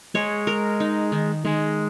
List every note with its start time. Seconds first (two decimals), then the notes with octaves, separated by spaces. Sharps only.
0.14 G#3 C#5
0.47 A#4
0.80 D#4
1.12 D#3
1.45 D#3 G#3